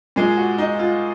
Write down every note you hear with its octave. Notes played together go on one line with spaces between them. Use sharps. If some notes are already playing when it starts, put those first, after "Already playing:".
A#2 G#3 G#4
F#4
D#4
F4